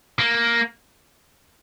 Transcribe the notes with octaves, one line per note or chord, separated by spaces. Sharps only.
A#3